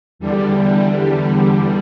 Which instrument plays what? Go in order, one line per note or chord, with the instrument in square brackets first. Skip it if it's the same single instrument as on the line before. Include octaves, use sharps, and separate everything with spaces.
[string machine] E2 D3 G3